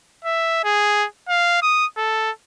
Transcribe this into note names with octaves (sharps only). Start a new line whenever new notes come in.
E5
G#4
F5
D#6
A4